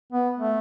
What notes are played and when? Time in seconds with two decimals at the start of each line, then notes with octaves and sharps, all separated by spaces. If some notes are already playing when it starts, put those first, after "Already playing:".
0.13 B3
0.38 A3